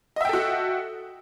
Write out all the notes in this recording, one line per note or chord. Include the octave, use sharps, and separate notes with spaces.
F#4 A4 D#5 E5 G5